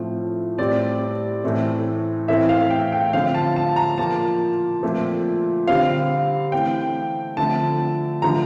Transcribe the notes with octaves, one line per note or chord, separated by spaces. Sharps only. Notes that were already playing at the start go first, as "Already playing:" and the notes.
Already playing: A2 F3 A3 C4
A2 G3 C4 D5
A2 E3 A3 C4
A2 E3 A3 C4 E5
F5
G5
G5
D3 F3 C4 F5
A5
A5
A#5
A#2 F3 A#3 A5
A#2 F3 A3 C4
D3 G3 C4 F5
E3 A3 C4 G5
D3 F3 A3 C4 A5
D3 F3 A3 A#5